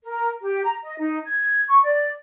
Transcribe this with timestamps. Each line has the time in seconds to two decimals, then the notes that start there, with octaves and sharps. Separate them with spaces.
0.05 A#4
0.41 G4
0.64 A#5
0.83 D#5
0.99 D#4
1.26 G#6
1.69 C#6
1.84 D5